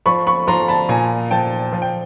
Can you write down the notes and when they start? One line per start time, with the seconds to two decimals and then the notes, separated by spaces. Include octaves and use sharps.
0.06 F3 B5 C#6
0.27 B5 C#6
0.47 F3 A#5 C6
0.68 A5 B5
0.89 A#2 G#5 A#5
1.31 F3 G5 A5
1.73 F3
1.82 G5